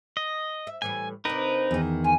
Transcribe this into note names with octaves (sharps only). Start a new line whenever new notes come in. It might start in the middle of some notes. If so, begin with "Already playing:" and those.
D#5
E5
A2 E3 G3 G#5
C3 C4 D4 D#4 A#4 B4
E2 D#3
F4 G#5